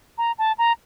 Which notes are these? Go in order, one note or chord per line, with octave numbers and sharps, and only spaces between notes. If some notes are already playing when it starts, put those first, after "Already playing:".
A#5
A5
A#5